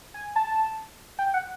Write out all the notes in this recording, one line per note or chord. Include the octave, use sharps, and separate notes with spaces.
G#5
A5
G5
F#5